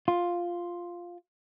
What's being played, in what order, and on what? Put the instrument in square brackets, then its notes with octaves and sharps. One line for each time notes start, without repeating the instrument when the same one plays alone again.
[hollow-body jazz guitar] F4